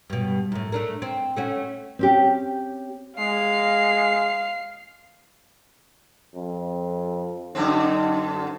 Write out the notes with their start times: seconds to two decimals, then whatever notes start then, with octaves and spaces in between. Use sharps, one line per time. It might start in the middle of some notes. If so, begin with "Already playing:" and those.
0.10 G2 B2
0.52 F#2 A2
0.72 A3 D4 A#4
1.02 C4
1.36 A3 C#4 F#4
1.99 C4 C#4 G4
3.19 G#3 F5 C7
6.35 F2
7.55 F#2 D3 C4 D#4